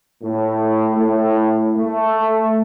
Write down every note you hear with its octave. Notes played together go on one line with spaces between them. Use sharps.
A2
A2
A3